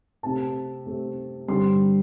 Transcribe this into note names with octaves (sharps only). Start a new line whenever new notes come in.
C3 A3 C4 A5
C3 A3 C4
G2 D3 G3 C4 C6